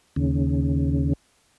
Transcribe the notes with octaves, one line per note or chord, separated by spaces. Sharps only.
D#2 C#3